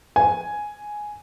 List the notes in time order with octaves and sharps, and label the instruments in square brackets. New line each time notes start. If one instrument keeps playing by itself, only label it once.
[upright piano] G#5